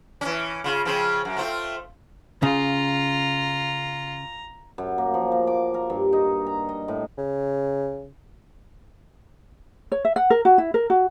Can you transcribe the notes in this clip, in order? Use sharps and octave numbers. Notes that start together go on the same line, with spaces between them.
E3 C#4
C#3 F4
C#3 F3 C4
F#2
A3 C4 F4
C#3 F4 A#5
F#2
A#3
F3
A#3
D6
A#4
G2
D#4
A#5
D#5
A2
C#3
C#5
E5
F#5
A#4
F#4
E4
A#4
F#4